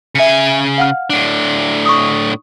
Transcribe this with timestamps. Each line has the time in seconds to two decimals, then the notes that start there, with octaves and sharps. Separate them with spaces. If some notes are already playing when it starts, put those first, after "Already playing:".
0.15 C#3 E5 G#5 C#7
0.78 F5 F#5 F6
1.10 A2 D4
1.86 C#6 D#6